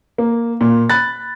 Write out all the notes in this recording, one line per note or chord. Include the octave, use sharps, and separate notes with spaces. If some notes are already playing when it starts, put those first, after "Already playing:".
A#3
A#2
B5 F#6 A6